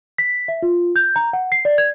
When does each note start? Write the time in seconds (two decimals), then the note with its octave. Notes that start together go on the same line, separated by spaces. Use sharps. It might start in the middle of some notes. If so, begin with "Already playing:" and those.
0.18 B6
0.48 E5
0.62 F4
0.96 G6
1.16 A#5
1.33 F#5
1.52 C7
1.65 D5
1.78 G#6